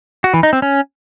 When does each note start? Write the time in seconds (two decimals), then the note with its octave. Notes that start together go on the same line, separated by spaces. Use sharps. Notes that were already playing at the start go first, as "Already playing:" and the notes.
0.24 F#4
0.34 E3
0.43 D#4
0.53 C4
0.62 C#4